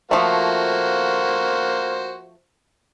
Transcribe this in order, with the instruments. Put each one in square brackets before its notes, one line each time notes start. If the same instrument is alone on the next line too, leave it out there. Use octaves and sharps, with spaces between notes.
[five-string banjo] F3 A3 [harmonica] A#3 F#4 C5